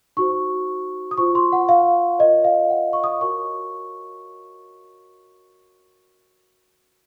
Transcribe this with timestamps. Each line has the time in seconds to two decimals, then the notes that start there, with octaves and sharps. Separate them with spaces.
0.17 D#4 F#4 C5 C#6
1.11 D#6
1.18 F4 C5 C#6
1.35 C6
1.52 F#5
1.69 F5
2.19 F4 A#4 C#5 D#5
2.44 F5
2.70 F#5
2.93 C#6
3.04 D#6
3.21 F#4 A#4 C#5 C#6